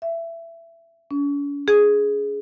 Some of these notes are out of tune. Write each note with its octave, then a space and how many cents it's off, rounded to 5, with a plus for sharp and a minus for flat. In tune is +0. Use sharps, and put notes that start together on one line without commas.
E5 +20
C#4 +45
G#4 +5